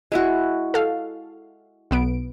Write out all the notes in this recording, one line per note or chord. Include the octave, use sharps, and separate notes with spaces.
G#3 E4 F#4
A4 F5
B1 B3 D7